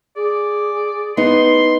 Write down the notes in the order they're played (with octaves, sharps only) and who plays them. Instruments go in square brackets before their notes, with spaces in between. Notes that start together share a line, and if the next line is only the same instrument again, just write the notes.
[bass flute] G#4 [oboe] D5
[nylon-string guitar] B3 D#4 [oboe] C6